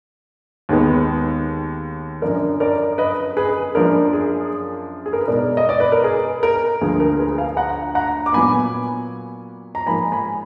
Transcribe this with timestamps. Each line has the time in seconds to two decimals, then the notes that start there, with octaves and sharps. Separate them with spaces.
0.69 D#2 D#3 G#3 B3
2.22 F#2 D3 F3 A#4 D5
2.60 A#4 D5
2.98 B4 D#5
3.37 G#4 B4
3.75 F#2 F3 A#3 D4 A#4
4.13 G#4
5.06 G#4
5.13 A#4
5.20 B4
5.28 B2 G#3 D#4 A#4 D5
5.57 D#5
5.69 D5
5.80 B4
5.92 A#4
6.04 G#4
6.43 A#4
6.81 D2 D3 F3 A#3 G#4
7.00 A#4
7.18 G#4 B4
7.38 F5 G#5
7.57 F#5 A#5
7.95 F#5 A#5
8.26 D6
8.33 A#2 F#3 B3 G#5 B5
9.75 A#5
9.86 G#2 F3 A#3 D#4 G#5 B5
10.12 G#5 B5